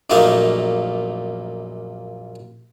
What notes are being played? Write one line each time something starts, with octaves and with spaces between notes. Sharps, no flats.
A#1 F#2 A3 A#3 D#4 F5